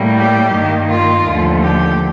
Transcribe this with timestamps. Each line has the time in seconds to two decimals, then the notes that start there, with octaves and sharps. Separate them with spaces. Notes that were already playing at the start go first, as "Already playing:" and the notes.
Already playing: A2 G3 A#3
0.16 G4
0.53 G2 D#3 A#3
0.90 F4
1.26 D#2 D3 F3 A3
1.63 G4